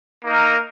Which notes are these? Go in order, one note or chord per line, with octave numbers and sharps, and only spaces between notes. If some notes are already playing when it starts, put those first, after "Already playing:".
A#3 D#4 A#4